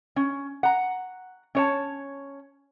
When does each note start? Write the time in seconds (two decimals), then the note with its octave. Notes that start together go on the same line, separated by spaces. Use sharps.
0.16 C#4
0.63 F#5 A#5
1.55 C#4 C#5 A5